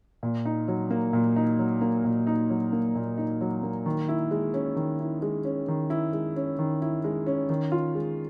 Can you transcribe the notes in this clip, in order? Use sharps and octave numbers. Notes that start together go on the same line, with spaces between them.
A#2
D#4
F#3
A#3
A#2
D#4
F#3
A#3
A#2
D#4
F#3
A#3
A#2
D#4
F#3
A#3
D#3
E4
G#3
C#4
D#3
E4
G#3
C#4
D#3
E4
G#3
C#4
D#3
E4
G#3
C#4
D#3
F4
G#3